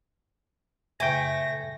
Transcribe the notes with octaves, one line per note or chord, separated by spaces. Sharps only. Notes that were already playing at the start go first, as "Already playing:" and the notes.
F#2 A#2 C#3 A3 G5 G#5 A#6